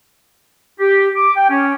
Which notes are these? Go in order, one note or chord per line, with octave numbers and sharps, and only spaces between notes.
G4
D6
G5
C#4